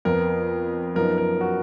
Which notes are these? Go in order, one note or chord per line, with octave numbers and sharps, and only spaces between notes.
F2 F3 B3 A#4
F#2 F3 B3 D#4 A#4
A#4
F#4